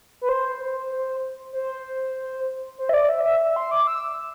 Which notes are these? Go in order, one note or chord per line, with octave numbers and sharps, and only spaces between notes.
B4
C5
C5
C5
E5
D5
E5
E5
E5
C6
D6
E6